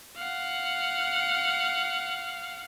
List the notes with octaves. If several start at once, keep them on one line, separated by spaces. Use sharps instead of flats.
F5 F#5